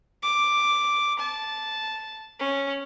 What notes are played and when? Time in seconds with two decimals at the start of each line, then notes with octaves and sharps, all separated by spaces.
0.23 D6
1.19 A5
2.40 C#4